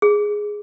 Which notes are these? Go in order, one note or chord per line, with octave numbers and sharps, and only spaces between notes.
G#4